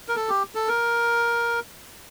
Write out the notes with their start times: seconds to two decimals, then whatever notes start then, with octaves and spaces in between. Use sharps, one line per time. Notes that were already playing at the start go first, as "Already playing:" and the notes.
0.08 A#4
0.16 A4
0.29 G4
0.55 A4
0.68 A#4